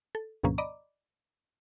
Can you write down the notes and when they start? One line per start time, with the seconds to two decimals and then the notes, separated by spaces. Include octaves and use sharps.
0.15 A4
0.43 D2 G#2 B2 F3 A#3 C#4
0.58 D5 D#5 A#5 B5 D6